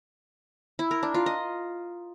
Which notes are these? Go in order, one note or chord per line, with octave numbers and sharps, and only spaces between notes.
E4
A#4
D4
F4
D#5